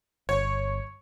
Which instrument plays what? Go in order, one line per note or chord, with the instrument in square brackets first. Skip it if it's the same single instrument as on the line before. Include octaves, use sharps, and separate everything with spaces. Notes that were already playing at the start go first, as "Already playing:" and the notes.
[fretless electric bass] G1 [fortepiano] C#5